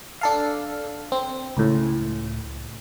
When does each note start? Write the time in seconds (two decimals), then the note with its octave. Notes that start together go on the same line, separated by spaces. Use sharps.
0.21 D4 A4 F5
1.12 C4
1.57 C#2 A2